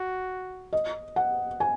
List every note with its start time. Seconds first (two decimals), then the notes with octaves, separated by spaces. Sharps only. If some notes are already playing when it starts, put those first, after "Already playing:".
Already playing: F#4
0.73 D#5
1.16 F#5
1.60 G#5